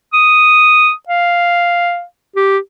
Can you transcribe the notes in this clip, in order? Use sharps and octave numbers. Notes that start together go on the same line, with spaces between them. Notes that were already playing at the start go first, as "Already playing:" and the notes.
D#6
F5
G4